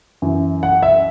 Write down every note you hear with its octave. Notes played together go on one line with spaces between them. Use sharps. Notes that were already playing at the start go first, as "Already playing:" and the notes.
F#2 E3
F#5
E5